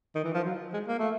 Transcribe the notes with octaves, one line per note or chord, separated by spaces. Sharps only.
D#3
E3
F3
F#3
G#3
A#3
A3